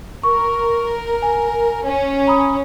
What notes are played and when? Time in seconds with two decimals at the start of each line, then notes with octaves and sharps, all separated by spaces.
0.23 A#4 C#6
1.22 G#5
1.84 C#4
2.27 A#5 B5 D#6